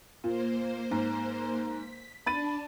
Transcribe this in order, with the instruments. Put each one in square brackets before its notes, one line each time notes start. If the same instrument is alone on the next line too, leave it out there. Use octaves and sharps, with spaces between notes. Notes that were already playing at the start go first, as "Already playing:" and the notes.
[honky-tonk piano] A#2 [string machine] A#3 C5
[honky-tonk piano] G#2
[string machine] B6
[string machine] D4 A5 [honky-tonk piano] B5 A6 D#7